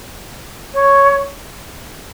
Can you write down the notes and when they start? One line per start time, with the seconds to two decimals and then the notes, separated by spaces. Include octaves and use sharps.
0.74 C#5